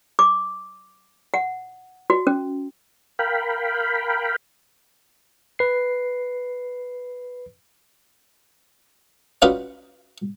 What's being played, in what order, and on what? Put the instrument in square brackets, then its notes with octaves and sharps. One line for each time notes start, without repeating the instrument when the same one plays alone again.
[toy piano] D6
F#5
F#4
C#4
[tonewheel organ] A#4 F5 G5 B5
[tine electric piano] B4 C7
[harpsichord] C#4 D#4 F4 F#4 B4 D5